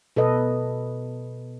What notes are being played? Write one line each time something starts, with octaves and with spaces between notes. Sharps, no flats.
B2 A4 B4 D#5